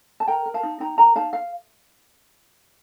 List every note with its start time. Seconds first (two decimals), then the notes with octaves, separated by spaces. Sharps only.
0.20 A5
0.27 A#4 G5 A#5
0.46 A#4
0.54 F5 A5
0.63 D#4
0.80 D#4 G5 A#5
0.98 A#4 G5 A#5
1.15 D#4 F5 A5
1.33 F5